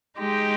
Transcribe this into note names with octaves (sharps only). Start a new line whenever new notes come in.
G#3 D#4 G4